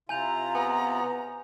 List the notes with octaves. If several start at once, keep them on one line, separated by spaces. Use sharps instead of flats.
C3 E4 F4 G#5 A#5 G6 F7
B3 G#5